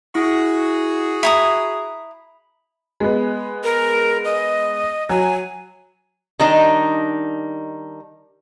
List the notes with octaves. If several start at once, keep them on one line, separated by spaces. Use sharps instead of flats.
E4 F#4 G#4
E4 A#5 B5 D#6
G#3 B3
A#4
D#5
F#3 G#5
D#3 G3 D4 D#4